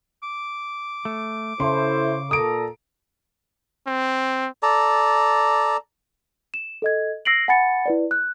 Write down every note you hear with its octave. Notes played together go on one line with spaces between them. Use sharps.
D6
A3
C#3 E4 A4 C5 C6
A#2 A4 A#5 D#6 D7
C4
A4 D5 A#5
E7
A4 D#5 G#6
E6 A#6 C7 D7 F#7
F#5 G#5 B5 A6 C#7
E4 B4 D5
F#6